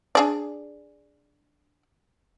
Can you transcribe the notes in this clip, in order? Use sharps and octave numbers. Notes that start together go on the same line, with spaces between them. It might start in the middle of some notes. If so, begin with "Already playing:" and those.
D4 G#4 D5